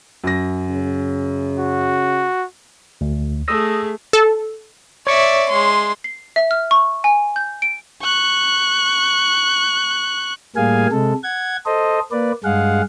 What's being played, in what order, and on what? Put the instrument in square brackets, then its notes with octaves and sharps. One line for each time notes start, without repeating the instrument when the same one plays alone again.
[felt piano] F#2 A#6
[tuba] C#3
[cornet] F#4
[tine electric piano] D2
[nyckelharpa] A3 G#4 [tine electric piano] D#6 E6 A#6
[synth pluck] A4
[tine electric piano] C#5 C#6 [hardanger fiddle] D5 E5
[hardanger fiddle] G#3 C6
[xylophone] C7
E5
F6
C#6
G#5
G6
D7
[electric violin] C#6 F#6
[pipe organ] A2 G3 A#3 G#4 F5 G#5
C3 G#3 A4
F#5 G#6
A4 C5 D#5
A#3 B4 D5
G2 G#3 G#4 F5 F#5